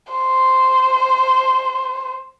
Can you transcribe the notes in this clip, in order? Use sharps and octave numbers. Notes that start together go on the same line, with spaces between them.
C5